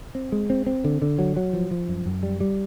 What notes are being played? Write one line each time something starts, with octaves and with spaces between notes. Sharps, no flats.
C4
G#3
C4
C4
D3
D3
F#3
F#3
F3
F3
F#2
F#2
G3
G3